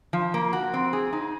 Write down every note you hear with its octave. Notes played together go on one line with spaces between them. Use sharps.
F3
A#3
F#4
C4
G#4
D#4